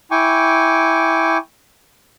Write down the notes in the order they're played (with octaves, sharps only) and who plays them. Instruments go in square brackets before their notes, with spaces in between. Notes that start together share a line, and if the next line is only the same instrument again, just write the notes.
[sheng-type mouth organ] E4 G5 G#5 C#6 D6